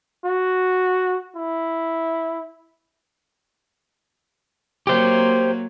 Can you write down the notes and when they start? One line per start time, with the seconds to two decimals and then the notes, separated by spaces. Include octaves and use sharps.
0.25 F#4
1.36 E4
4.87 F#3 A#3 G4 C5